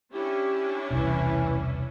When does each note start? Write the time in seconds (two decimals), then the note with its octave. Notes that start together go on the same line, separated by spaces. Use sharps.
0.13 C#4 D4 E4 G4
0.90 E1 C2 C3 E3